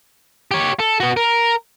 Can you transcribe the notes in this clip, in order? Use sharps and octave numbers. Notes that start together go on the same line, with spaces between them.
G4 C#5
A4
B3 F#4
A#4